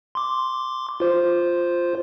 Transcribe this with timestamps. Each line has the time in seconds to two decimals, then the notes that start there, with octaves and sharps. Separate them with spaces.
0.15 C6 D6
1.00 F4 C5